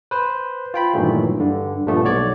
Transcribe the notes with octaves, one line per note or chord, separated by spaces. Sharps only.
B4 C5
F4 G5 B5
G2 A#2 D#3 E3 F#3 A3
G2 D3
G2 A#2 F3 A3 B3
B1 F#4 C#5 D5